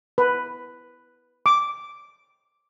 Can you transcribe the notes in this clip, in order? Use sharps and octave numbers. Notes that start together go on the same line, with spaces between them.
B4
D6